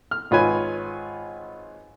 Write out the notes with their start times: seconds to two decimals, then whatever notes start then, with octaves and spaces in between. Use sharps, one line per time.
0.11 F6
0.31 G#1 F4 B4 C#5 G#5